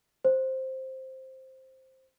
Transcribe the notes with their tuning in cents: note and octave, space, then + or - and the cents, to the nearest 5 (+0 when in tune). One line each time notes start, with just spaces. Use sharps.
C5 +5